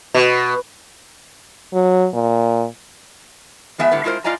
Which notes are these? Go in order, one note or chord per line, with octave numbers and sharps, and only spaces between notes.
B2
F#3
A#2
F3 G#3 B3 E5 G#5
A2 D3 G3 B3
G#3 E4 F4 A#4 C5
A2 F4 D5 D#5 G#5 A#5